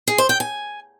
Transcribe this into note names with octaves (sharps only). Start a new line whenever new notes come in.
G#4
C5
G5
G#5